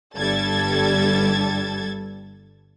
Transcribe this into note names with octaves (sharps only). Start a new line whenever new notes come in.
G1 G2 G3 A4 G#6 A6